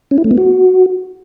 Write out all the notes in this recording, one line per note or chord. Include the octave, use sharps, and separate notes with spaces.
C#4
E4
A3
B3
F#4